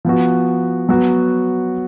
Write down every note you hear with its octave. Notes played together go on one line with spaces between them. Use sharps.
F3 B3 F#4
F#3 B3 F#4